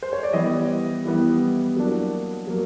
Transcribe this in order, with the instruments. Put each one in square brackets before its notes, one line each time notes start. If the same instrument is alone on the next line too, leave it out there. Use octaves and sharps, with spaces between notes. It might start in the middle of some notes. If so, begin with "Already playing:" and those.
[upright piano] C5
C#5
D5
E3 G3 B3 E4 D#5
E3 G3 B3 E4
F#3 A#3 D4
F#3 A#3